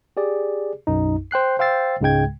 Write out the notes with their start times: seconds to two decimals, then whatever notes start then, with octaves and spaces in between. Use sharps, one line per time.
0.17 G4 G#4 D5
0.87 B1 F#2 D#4
1.31 C5 G5 F#6 C7
1.59 C5 F5 G5 E6 A6 C7
2.01 C#2 G#2 C#3 G#3 G5 G#6